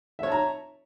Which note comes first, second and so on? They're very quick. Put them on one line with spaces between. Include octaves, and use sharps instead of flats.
E5 C#5 A5 A#5